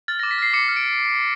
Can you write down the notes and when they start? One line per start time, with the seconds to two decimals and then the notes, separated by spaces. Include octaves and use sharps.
0.08 F6 A6
0.19 D6 A#6
0.31 B6
0.38 F6 C7
0.53 D6 C#7
0.68 F6
0.76 D7